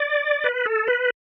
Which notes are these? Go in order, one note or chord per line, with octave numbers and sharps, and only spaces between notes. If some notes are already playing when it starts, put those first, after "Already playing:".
Already playing: D5
B4
A4
B4